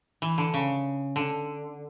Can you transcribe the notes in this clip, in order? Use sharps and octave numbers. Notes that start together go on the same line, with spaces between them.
E3
D3
C#3
D3